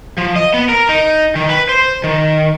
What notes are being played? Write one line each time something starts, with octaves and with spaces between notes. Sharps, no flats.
F3
D#5
B3
A#4
D#4
D#3
B4
C5
D#3